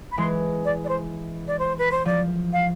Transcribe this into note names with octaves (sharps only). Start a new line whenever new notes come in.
B5
E3 G#3 C6
D5
D5
C5
D5
C5
B4
C5
F3 D5
F5